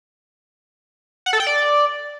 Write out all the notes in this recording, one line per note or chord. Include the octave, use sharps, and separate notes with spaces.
F#5
A4
G5
D5